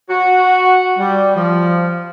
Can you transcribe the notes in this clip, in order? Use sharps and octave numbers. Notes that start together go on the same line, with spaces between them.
F#4
G3
F3